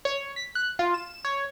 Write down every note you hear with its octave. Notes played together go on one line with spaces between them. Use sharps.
C#5
B6
F#6
F4
E7
C#5